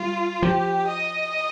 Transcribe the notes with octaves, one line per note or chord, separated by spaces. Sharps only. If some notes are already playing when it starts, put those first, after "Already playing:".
Already playing: G3 F4
F3 G4
D#5